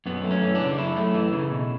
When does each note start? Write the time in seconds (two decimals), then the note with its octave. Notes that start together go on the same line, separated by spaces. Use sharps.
0.06 F#2 B3
0.24 A3
0.31 C#4
0.42 E3
0.55 D4
0.61 C#3
0.78 F#2 E4
0.97 A3
1.14 E3
1.32 C#3
1.51 B2